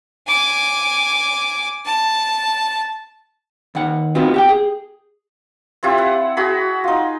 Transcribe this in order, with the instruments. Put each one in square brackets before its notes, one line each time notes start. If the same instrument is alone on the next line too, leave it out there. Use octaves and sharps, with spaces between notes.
[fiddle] G#5 D6
A5
[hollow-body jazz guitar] D#2 F#5
B3 C4 D#4 F4 F#4
G4 F#5 G5
G#4
[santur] C4 E4 F4 G4
F#5
F#4 G#4 B5
D#4 F4